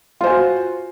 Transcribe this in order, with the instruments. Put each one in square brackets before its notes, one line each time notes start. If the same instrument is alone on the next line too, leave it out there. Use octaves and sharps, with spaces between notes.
[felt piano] F4
C5
G#5
F#4